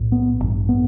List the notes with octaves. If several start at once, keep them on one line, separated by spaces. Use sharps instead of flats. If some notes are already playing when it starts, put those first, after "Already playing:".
Already playing: B1 A2
B3
A1 G2
B3